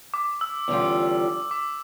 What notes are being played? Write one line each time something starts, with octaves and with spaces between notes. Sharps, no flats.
D6
E6
E2 D3 G3 C#4 F4
D6